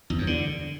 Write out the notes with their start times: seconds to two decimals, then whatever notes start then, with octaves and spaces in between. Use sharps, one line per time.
0.10 E2
0.18 F#2
0.27 D3